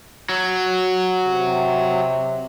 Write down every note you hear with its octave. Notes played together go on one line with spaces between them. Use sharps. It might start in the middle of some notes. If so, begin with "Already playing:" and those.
F#3
C3